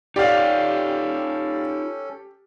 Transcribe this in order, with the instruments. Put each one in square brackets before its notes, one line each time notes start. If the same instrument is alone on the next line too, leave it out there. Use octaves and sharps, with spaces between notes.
[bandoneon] C#4 A4 [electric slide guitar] D#4 F4 F#5 [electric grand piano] G4 [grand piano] D5 F5